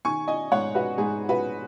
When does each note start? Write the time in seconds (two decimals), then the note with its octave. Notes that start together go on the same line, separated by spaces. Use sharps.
0.05 D#3 G#5 C#6
0.28 D#5 G#5
0.52 G#2 C#5 F#5
0.75 F#4 B4
0.98 G#2 G#4
1.29 F#4 B4